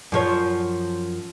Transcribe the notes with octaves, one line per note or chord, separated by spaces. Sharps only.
F#2 F3 C#5